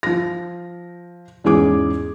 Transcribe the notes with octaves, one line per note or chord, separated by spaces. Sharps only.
F3 A#6
E2 G#2 C#4 G#4 D6